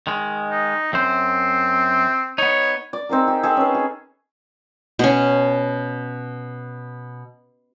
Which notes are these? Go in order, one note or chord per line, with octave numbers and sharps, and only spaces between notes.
D#3 G#3
D#4
F#2 C4 C5
B3 D#4 C#5
D5
C4 D#4 G#4 A#4
G4
G#4 A4 C5 G5
C#4 B4
G#4
B2 C#4